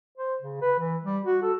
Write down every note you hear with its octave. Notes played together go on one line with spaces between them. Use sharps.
C5
C#3
B4
E3
G3
F#4
A4